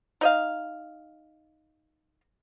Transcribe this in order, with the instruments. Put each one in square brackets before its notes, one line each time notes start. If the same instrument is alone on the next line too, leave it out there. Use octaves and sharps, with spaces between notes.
[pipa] D#4 D#5 F5